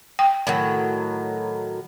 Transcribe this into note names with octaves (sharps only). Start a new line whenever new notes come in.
G5
A2 D#3 F#3